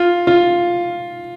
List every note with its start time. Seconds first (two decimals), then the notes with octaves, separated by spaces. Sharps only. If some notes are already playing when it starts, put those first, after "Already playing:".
Already playing: F4
0.27 F4